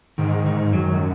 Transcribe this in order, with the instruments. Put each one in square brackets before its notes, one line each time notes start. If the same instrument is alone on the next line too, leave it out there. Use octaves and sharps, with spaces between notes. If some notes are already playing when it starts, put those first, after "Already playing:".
[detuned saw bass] G#2 [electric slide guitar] D#3
[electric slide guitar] D#3
[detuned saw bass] F#2 [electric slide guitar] F#3